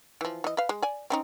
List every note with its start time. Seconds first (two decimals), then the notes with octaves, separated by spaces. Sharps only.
0.21 E3 F3
0.44 E3 D#5
0.57 B4 F5
0.69 G#3
0.82 D5 G#5
1.10 C4 C#4 D#4